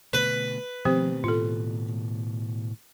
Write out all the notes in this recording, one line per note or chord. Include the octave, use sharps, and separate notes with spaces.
B2 D3 A3 B4
B2 D#3 F3 A3 C4 G4 C5
A2 F4 A4